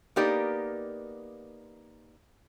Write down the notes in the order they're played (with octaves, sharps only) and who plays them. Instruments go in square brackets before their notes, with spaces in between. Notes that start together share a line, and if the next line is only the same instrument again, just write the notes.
[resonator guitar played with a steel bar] A#3 B3 D#4 G4 A#4 D5